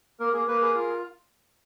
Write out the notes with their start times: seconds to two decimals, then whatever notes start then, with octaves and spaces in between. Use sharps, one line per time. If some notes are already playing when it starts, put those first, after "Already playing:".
0.20 A#3 A#4
0.33 A#3 G#4
0.47 A#3 B4
0.61 G#4 B4
0.75 F4 A#4